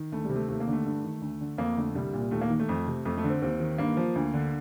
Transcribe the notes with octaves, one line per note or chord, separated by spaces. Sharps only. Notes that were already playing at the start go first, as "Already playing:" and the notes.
Already playing: D#3
D2 A3
C3 G3
A3
D#2 A3
A#3
D3
A3
G2
D#3
D2
D3
F2 A#3
D3 A3
C2 G3
A#2
D#2 A3
A#3
D#3
A3
F2
C3
F2 A3
A3
D3
C4
D#2 C4
D#3
G2 A#3
F3
D2
D3